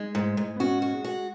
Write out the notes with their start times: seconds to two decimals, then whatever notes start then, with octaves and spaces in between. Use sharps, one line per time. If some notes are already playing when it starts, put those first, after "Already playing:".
Already playing: G#3 D#4
0.15 G#2
0.37 G#2
0.56 B3
0.59 C#4 F#4
0.82 F#4
0.93 G#3
1.04 F#4